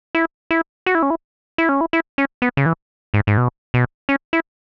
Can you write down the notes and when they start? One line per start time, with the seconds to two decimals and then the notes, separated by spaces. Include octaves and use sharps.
0.15 E4
0.51 E4
0.86 F#4
0.95 E4
1.03 C#4
1.10 E4
1.58 E4
1.69 C#4
1.81 E4
1.93 E4
2.18 C#4
2.42 B3
2.57 C#3
2.66 E3
3.14 G#2
3.27 G#2
3.37 B2
3.74 B2
4.09 C#4
4.33 E4